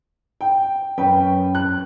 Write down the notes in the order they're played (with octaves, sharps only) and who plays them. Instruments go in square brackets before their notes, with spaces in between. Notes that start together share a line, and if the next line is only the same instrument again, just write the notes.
[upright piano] G5
[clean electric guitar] F#2 C#4 B4 [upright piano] G5
[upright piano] F#6